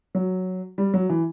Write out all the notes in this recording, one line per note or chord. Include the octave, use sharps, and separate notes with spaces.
F#3
G3
F#3
E3